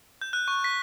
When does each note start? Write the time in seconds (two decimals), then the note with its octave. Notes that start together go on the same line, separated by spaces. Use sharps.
0.21 G6
0.33 F#6
0.48 C#6
0.64 B6